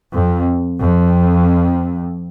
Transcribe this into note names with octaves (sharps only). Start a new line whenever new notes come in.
F2
F2